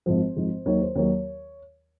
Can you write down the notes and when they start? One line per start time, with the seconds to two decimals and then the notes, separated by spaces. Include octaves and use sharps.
0.06 G#1 G#2 F3 C5
0.36 G#1 G#2 F3
0.65 D#2 D#3 F#3 C#5
0.82 C5
0.96 D#2 D#3 F#3 C#5